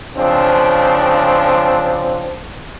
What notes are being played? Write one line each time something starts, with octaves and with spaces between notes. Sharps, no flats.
C#3 F3 C4 D4